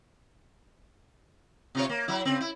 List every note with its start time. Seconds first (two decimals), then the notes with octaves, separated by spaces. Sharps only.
1.75 C3 F4 C#5
1.89 A#3
2.08 F#3 E4
2.25 C#3 C4
2.41 E4